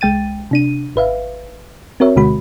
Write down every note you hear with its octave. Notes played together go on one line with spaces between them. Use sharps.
C2 G#3 G5 A6 D#7
C3 D4 D#7
G#1 B4 E5 F5
C4 F#4 A#4 C#5 E5
D2 B2 D3 G#3 F#4 B5